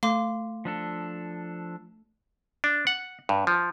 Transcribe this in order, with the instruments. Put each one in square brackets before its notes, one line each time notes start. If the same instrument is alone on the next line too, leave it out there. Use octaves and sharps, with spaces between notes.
[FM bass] A3 [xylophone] F5 C6 D6
[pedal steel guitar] F3 D4 A4
[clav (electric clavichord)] D4
F#5
G2
F3